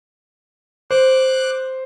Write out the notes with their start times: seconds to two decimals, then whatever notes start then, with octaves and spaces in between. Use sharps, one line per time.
0.91 C5 D6 F#6